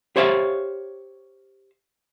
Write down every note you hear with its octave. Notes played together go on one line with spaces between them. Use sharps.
G4 C5 C#5 E5 F5